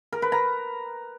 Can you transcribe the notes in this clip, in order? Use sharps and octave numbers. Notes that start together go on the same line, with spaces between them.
A#4
B4
A#5